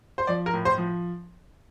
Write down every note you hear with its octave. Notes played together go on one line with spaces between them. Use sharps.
C5
F3 D5
A#4
A2
C5
F3